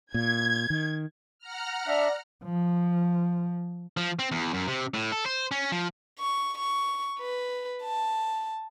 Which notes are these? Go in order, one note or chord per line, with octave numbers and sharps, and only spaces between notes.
A#2 G#6
D#3
F#5 A#5 F6
D4 D5 E5
F3
F3
C4
E2
F#2
C3
A2
A4
C5
C#4
F3
C#6
C#6
B4
A5